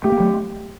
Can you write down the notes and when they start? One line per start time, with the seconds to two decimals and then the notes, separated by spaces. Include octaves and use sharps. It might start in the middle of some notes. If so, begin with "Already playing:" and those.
0.04 A3 G4
0.12 A#3
0.20 F#3 A3